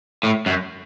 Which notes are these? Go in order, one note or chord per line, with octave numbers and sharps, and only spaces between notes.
A2
F#2